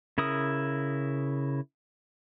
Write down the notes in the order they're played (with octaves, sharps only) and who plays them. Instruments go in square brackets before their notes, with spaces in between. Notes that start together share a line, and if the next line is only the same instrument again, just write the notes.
[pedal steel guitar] C#3 E4 A#4 D#6